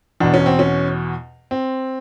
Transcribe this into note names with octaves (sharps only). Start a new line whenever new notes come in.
E2 B2 D4
C#4
C4
C#4
C4